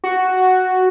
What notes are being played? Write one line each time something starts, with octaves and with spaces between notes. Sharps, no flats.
F#4